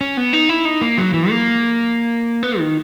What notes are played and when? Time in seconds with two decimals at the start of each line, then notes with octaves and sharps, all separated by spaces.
0.01 C#4
0.17 B3
0.33 D#4
0.49 E4
0.65 D#4
0.82 A#3
0.98 F#3
1.14 E3
1.30 A#3
2.43 B3
2.59 D#3